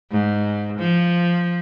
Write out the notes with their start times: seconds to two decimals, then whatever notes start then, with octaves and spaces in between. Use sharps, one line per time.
0.11 G#2
0.79 F3